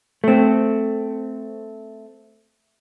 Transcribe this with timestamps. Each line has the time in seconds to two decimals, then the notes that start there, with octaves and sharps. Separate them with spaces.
0.24 A3 C4